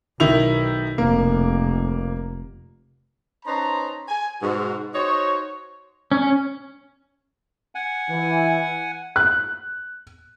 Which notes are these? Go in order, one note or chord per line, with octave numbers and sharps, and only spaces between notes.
B1 D#3 E4 F7
F1 A#3
C#4 D#4 B4 C5 A5 A#5
G#5
G#2 B2 F#4
D#4 F#4 C5 C#5
C#4
F#5 G#5
E3
F#6